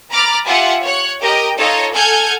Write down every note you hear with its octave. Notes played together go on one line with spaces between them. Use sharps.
A#5 B5 D6 F6 A6
F4 G4 E5 F#5 G#5
C#5 F#6
G4 A#4 D#5 G5
D#4 F4 A4 C#5 D#5
A4 F#5 G#5 F6 G6 G#6